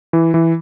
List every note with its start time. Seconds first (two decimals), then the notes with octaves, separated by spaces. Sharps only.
0.13 E3
0.34 E3